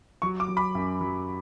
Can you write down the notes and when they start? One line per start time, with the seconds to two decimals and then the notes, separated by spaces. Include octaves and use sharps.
0.22 F#3 C#6
0.40 D6
0.48 F#3
0.57 B5
0.75 F#2
1.01 F#3